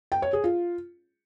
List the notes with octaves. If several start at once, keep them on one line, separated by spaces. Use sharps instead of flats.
G5
C#5
G#4
F4